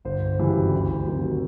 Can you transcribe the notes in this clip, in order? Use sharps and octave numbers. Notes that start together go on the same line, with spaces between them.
G1 C5
F#2 C#3 E3 G3
D2
C3 D#3 F#3